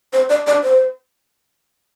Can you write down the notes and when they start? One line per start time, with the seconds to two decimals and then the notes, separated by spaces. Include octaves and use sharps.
0.13 C5
0.29 D5
0.47 D5
0.63 C5